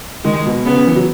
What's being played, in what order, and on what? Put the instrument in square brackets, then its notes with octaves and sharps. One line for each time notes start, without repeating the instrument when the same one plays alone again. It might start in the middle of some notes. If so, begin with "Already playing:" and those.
[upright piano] D#3 [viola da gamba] G#3
[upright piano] B2
[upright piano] C#3 [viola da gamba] B3
[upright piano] C#3
E3
F#3